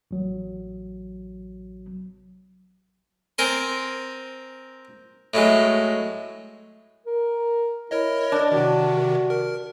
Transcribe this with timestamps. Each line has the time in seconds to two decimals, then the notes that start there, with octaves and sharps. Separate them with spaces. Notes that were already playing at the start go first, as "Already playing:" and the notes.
0.11 A1 F#3
3.38 C4 A#4 G#5 C6
5.34 A2 F#3 G#3
7.06 A#4
7.91 E4 A#4 C#5 D#5
8.32 D4
8.52 C3 D#3 F#4
9.30 A#4